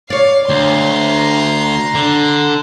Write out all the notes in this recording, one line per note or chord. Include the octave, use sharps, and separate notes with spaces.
C#5 D5 F5
D2 A#5 C6
D3